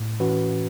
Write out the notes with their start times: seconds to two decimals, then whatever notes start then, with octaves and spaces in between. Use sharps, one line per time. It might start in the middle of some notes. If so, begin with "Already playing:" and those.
Already playing: A2
0.20 E3 C#4 F#4 B4